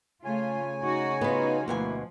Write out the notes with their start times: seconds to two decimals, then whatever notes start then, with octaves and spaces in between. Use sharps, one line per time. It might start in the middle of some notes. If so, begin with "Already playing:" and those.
0.25 C#3 A3 F4 C#5 G#5
0.82 D#4 F#4
1.21 B3 D#4 F4 F#4 B4
1.68 D2 B2 F3 A#3 E4 G#5